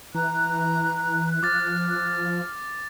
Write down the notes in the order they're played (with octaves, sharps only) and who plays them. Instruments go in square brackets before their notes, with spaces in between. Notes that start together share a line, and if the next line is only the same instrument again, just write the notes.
[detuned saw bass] E3 [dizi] A#5 [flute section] F#6
[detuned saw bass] F3 [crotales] D6 A6 [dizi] F6